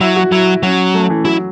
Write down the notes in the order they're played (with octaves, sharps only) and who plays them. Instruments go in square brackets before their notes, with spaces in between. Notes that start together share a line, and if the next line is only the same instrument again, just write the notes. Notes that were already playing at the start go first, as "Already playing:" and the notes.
[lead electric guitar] F#3 [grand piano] E4
[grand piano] F#4
[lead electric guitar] F#3 [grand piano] E4
[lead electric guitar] F#3 [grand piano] C#4
[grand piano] A3
E3
[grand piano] F#3 [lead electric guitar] E4